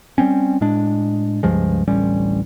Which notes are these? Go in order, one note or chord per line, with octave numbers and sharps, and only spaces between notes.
G3 A#3 C4 C#4
A2 G#3 D4
C#2 G2 F3 G#3
D1 A1 G3 C#4